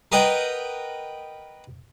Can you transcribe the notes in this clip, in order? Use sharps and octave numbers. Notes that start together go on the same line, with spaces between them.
A#4 B4 D#5 F#5 G5